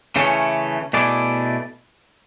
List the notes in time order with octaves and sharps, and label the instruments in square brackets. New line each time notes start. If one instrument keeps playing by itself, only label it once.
[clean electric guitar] C#3 E3 A3 C#4
B2 A3 E4 G#4 D5